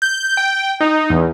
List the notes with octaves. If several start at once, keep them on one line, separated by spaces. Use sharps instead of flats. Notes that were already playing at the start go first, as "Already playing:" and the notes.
G6
G5
D#4
E2